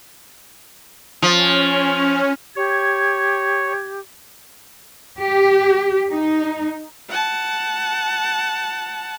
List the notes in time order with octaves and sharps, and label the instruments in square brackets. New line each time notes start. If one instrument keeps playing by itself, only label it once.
[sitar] F3 [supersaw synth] C#4
[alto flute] G4 [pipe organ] C#5 [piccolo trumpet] G#6
[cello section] G4
D#4
[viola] F#5 A5